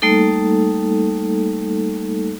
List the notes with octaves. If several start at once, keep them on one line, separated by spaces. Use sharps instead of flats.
G3 A3 A#3 D#4 A4